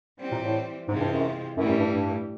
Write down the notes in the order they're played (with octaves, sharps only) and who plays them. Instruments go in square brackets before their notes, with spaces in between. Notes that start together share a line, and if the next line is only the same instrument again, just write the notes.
[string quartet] E3 G3 C4
[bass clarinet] A#2
A2
[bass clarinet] G#2 [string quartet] C3 E3 G#3 C4 F4
[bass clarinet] G2
F#2
[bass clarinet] F#2 [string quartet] A2 E3 G3
[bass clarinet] F#2
G2
G2